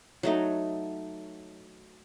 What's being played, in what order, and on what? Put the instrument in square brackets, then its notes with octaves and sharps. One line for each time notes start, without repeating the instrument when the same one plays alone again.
[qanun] F#3 A3 D#4